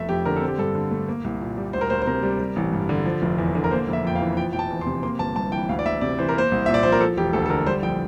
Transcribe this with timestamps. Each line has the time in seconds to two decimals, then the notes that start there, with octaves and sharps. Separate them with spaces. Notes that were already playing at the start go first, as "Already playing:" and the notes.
Already playing: F1 A3 E5
0.09 F2 G4
0.25 D3 A#4
0.36 A4
0.42 C4
0.48 G4
0.58 G2 A4
0.75 D3
0.91 A3
1.08 A#3
1.24 C2
1.41 A#2
1.57 G3
1.73 D2 C5
1.81 A#4
1.90 D2 C5
2.02 C5
2.06 C3 A#4
2.23 G3
2.40 G3
2.56 A1
2.72 G2
2.89 D3
3.06 F3
3.22 F1
3.38 E2
3.55 D3
3.64 A#4
3.71 A#3 C5
3.88 F1
3.93 E5
4.04 F2 G5
4.15 F5
4.21 E3
4.37 F3 G5
4.53 F1 G5
4.59 A5
4.70 E2
4.81 C6
4.87 C3
5.03 A#3 C6
5.19 G1 A5
5.36 G2 A5
5.52 E3 G5
5.69 D2 F5
5.79 D5
5.85 D2 E5
6.01 C3 D5
6.18 E3 C5
6.29 A#4
6.35 A#3 C5
6.52 C2
6.66 A#2 E5
6.74 D5
6.83 F3 C5
6.92 A#4
7.01 F3 A4
7.17 E1 G4
7.33 D2 A4
7.46 A4
7.50 D3 A#4
7.66 G3 C5
7.82 A#1 G5